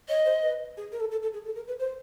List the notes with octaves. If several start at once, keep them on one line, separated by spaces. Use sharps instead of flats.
C#5 D#5
C5
B4
G#4
A#4
A4
A4
A4
G#4
A4
A#4
B4
C5